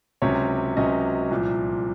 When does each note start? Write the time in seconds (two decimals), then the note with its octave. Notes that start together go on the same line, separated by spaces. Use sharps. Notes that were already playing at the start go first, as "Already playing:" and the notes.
0.22 C#2 C3 F#3 C#4 C#5
0.77 C#2 C3 F#3 C#4 D#5
1.31 C2 A#2 F3